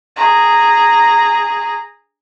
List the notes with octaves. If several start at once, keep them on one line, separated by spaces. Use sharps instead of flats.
G#4 A#5